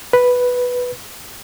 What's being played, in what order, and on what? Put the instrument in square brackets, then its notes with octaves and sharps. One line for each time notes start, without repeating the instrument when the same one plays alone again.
[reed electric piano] B4